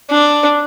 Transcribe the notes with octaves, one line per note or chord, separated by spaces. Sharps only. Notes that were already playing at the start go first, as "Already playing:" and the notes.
D4